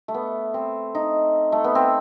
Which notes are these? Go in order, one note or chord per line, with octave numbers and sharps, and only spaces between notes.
A3
B3
C4
D#4
A3
B3
C4